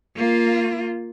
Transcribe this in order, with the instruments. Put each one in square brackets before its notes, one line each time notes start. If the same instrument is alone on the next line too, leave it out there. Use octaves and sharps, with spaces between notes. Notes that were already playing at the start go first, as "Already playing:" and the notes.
[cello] A#3 F4